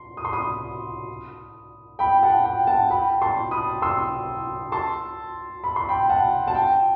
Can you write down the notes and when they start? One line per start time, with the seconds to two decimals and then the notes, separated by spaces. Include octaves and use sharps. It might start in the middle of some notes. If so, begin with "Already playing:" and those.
Already playing: C6
0.17 D#6
0.25 C6
0.33 B5 D#6
1.99 G5 B5
2.23 F#5 A5
2.45 G5
2.67 F#5 A5
2.90 G5 B5
3.22 A5 C6
3.51 B5 D#6
3.82 C6 E6
4.72 A5 C6
5.64 B5
5.76 C6
5.89 G5 B5
6.09 F#5 A5
6.48 A5
6.55 G5